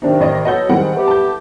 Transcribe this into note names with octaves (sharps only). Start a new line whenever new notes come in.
C3 D#3 D4 D#4
A1 D5 D#5
B2 F#3 A4 D#5 F#5 G6
G#2 D#3 G3 C4 F#5
A3 B3 G4
A5 G6